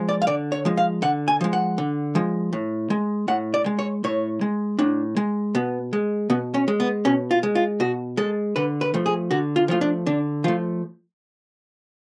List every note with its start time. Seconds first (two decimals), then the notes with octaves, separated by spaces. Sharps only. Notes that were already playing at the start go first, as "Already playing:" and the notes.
Already playing: F3 G#3
0.09 D5
0.22 F5
0.27 D3 D5
0.52 C#5
0.65 F3 G#3
0.77 F5
1.02 D3 F#5
1.28 G#5
1.41 F3 G#3
1.53 F#5
1.78 D3
2.15 F3 G#3
2.53 A2
2.90 G#3
3.28 A2 F#5
3.54 D5
3.66 G#3
3.79 C#5
4.04 A2 C#5
4.41 G#3
4.79 A2 D4
5.17 G#3
5.55 B2 B3
5.93 G#3
6.30 B2 B3
6.54 C#4
6.68 G#3
6.80 B3
7.05 B2 C#4
7.31 F4
7.43 G#3
7.55 F4
7.80 B2 F#4
8.17 G#3 A4
8.56 D3 B4
8.81 B4
8.94 F3 A3
9.06 G#4
9.31 D3 F#4
9.56 F4
9.68 F3 A3 F4
9.81 D4
10.06 D3 D4
10.44 F3 A3 F4